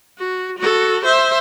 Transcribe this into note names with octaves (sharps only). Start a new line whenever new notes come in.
F#4
F#4 A4
C5 E5